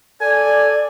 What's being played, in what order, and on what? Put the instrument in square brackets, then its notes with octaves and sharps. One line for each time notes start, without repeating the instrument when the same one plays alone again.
[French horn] A4 [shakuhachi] D5 [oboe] G#5